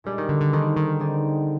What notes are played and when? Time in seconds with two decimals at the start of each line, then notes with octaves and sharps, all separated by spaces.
0.04 A#2 G3 G#3 D4 G#4 D5
0.18 D#3
0.29 D3
0.41 D3
0.53 D3 D#3 G#3 C4 D#4 G4
0.77 D#3
1.00 C4 D#4 G#4 D5